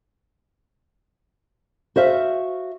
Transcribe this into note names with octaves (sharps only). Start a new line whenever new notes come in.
F#4 C5 E5 F5